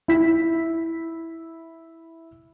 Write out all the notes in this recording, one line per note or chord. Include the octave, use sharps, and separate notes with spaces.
E4 B6